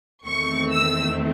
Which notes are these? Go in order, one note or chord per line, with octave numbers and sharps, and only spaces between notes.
E2 D#3 A3 C4 C#6
E6